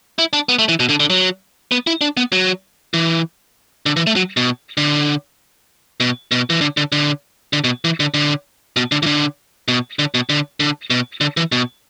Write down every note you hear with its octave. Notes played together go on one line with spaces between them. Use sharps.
E4
D4
B3
A3
E3
B2
D3
D3
F#3
B3
E4
D4
B3
F#3
E3
D3
E3
A3
F#3
B2
D3
B2
B2
E3
D3
D3
D3
D3
B2
E3
D3
D3
B2
D3
E3
D3
B2
D3
B2
D3
D3
B2
D3
E3
B2